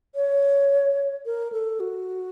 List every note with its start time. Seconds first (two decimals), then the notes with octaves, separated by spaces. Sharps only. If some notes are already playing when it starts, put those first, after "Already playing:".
0.15 C#5
1.26 A#4
1.52 A4
1.80 F#4